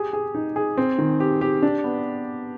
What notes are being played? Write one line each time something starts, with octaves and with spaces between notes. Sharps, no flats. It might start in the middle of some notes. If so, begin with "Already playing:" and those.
Already playing: G4 G#4
G#4
D#4
G#4
C4
D#3
G4
G4
D4
B3